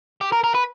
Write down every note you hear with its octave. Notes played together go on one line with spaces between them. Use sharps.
G4
A#4
A#4
B4